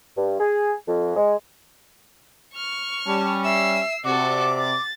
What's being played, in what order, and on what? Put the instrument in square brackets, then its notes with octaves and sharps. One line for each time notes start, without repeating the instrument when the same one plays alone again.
[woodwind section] G2
G#4
F2
G#3
[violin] C#6 F6
[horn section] G3 C#4 [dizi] A5
[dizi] E5 [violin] E6 C7
[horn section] C3 D5 [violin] F#4 A4 [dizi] D6
[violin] A6